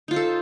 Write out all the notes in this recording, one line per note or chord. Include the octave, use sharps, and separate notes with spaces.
D#4 F4 A4 C5